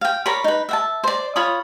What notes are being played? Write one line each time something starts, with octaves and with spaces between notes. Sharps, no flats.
F5 G5
A#4 C#5 D5 B5
D#4 B4
E5 F#5 A5
C5 D5
F4 C#5 B5 D#6